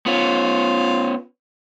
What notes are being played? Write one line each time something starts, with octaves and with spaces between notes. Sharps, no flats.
B3 C#4 F4